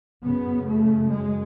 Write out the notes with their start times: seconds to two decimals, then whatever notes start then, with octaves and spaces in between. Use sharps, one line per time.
0.23 F#2 C#3 B3
0.67 A3
1.10 G#3